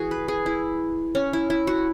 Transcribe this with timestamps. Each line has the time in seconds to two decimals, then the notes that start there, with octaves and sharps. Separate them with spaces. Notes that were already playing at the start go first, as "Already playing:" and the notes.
Already playing: E3 F#4 G#4
0.11 B4
0.28 G#4
0.46 E4
1.15 C#4
1.33 E4
1.50 E4
1.67 F#4